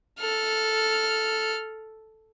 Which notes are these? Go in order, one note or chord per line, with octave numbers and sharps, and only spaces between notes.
A4 F6